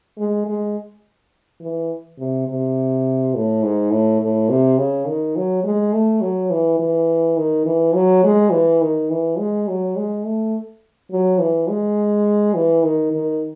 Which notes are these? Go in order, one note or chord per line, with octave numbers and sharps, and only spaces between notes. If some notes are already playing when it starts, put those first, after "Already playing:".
G#3
G#3
E3
C3
C3
A2
G#2
A2
A2
C3
C#3
D#3
F#3
G#3
A3
F#3
E3
E3
D#3
E3
F#3
G#3
E3
D#3
E3
G#3
F#3
G#3
A3
F#3
E3
G#3
E3
D#3
D#3